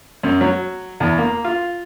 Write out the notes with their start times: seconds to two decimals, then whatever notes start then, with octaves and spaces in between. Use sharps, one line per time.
0.23 F#2
0.41 F#3
1.00 E2
1.18 A#3
1.44 F4